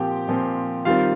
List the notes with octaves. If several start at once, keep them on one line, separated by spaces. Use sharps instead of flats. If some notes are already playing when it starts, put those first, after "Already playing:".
Already playing: A#2 F3 C4 G4 G5
A#2 F3 C4
D#3 G3 C4 F4 F5